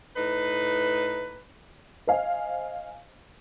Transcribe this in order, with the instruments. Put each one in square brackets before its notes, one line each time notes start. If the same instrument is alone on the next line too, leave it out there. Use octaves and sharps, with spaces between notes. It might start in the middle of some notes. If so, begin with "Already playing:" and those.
[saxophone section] A2 D#4 B4
[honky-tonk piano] C5 D#5 F5 G#5